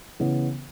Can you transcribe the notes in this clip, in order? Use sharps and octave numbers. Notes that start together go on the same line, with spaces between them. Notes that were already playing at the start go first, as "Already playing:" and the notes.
C#3 E3 B3